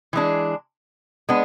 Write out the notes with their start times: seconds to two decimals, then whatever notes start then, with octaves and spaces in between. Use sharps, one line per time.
0.13 E3 G#3 D4 G#4
1.29 G#3 B3 D4